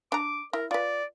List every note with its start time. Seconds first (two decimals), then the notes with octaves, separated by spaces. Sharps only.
0.12 D4 A#5 D6
0.53 E4 A#4
0.71 F4 B4 D5